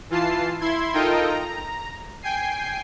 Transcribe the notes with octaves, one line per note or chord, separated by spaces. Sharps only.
E3 F4 A5 C7
E4 C6 G#6
D#4 F4 A4 A#4 D#5 G5
A#5
G5 G#5 C7